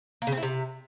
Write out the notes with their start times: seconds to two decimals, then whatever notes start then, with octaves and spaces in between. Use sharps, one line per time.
0.22 A#3
0.27 C#3
0.32 C4
0.37 E4
0.43 C3